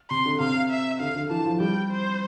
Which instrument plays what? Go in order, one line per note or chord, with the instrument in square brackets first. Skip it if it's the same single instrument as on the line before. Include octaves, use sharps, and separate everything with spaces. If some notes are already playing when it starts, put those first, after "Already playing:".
[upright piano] C3 [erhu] C6
[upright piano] D3
[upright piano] C3 [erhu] F5
[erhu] E5
[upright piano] D3 [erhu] F5
[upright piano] D3
[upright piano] E3 [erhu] A5
[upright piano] F3
[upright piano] G3 [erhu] G5
[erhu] C5